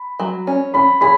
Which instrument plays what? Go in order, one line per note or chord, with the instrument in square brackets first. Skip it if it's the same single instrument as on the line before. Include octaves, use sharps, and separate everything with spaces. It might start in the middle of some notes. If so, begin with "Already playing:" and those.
Already playing: [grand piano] B5
[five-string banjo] F#3
C#4
[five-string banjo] C#4 [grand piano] B5
[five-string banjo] G#4 [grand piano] B5